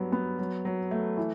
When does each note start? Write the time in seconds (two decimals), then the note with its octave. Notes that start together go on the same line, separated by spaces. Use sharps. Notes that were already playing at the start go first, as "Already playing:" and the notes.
Already playing: G2 F#3 B3
0.12 B3
0.39 F#3
0.65 F#3
0.91 A3
1.17 E3